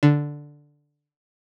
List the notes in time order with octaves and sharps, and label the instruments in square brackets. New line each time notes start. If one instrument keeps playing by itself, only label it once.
[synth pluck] D3